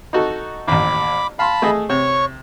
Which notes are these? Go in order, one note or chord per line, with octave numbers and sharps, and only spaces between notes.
D#4 F#4 A4
A1 D#2 B5 D6
F5 A5 B5 C6
A3 G#4 D#5
C3 C#5 C#6